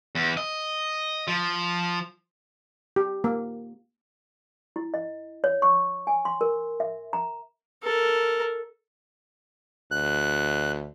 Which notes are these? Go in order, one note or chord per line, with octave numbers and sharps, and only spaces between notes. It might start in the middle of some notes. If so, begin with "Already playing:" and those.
E2
D#5
F3
G4
A#3
E4
D#5
C#5
C#6
G#5
C6
A#4
E5
A#5
A4 A#4
D2 F#6